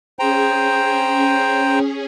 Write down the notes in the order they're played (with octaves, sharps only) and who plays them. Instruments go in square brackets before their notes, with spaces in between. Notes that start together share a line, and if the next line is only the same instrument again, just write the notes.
[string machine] C#4 G#4 [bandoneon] C5 G5 A#5